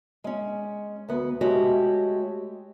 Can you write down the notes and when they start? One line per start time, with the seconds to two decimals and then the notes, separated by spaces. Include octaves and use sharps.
0.24 G#3 C#4
1.08 D2 B3
1.41 G#3 A3 C#4 F#4 G4